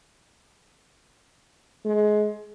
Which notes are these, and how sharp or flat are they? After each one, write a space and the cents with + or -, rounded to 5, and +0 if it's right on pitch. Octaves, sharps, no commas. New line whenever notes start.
G#3 +25